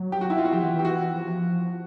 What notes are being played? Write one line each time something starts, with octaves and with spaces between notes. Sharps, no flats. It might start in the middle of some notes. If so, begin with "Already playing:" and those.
Already playing: F#3
G4
F#4
E4
F4
F#4
F3 G4
E3
E3
G4
F#4
F3